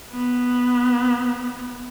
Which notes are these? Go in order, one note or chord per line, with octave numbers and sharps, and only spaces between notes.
B3